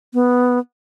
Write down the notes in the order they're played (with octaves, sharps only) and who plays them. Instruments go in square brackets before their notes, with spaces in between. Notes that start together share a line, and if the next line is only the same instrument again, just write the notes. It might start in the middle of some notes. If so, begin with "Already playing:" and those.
[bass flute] B3